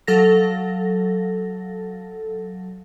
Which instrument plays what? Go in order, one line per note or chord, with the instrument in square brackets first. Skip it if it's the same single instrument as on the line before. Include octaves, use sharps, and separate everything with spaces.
[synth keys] F#3 A4 F5 A#6